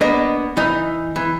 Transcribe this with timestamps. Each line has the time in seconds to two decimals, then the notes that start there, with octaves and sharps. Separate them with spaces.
0.01 A#3 B3 D4 D#5
0.57 E3 D#4
1.16 E3